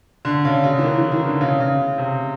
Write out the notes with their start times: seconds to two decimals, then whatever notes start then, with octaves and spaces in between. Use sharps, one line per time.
0.25 D3
0.45 C#3
0.64 C#3
0.79 E3
0.83 D#3
0.98 E3
1.12 D#3
1.26 D3
1.41 C#3
1.60 C#3
1.98 C3